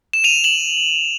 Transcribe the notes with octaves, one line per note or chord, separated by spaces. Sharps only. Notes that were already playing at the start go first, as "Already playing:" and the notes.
E7
D#7 F7
E7 F#7